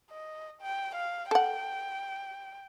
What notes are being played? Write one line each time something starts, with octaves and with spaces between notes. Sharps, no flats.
D#5
G5
F5
A4 F#5 G5